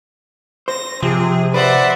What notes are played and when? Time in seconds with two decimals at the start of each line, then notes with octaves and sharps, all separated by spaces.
0.68 C5 A#6
1.03 C3 F3 G#4
1.54 B4 C5 D5 E5 F#5